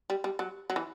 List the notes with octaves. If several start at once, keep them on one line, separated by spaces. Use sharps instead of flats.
G3
G3
F#3
F#3
E3